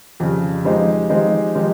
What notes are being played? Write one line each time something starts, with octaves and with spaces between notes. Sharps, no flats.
F2 C#3 G3
F3 G#3 C4 D#4 G4
F3 G#3 C4 D#4 G4
F3 G#3 C4 D#4 G4